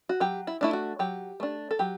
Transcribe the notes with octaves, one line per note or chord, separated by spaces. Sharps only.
F#4
F#3 G4
E4
A3 D4 E4
F#4
F#3 G4
A3 D4
A4
F#3 G4